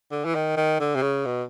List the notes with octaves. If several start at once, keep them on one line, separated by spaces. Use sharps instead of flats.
D3
E3
D#3
D#3
D3
C3
C#3
B2